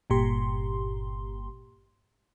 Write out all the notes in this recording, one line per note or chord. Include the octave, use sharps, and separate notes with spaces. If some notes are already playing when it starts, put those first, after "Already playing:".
G1 G2 A#2 G4 C6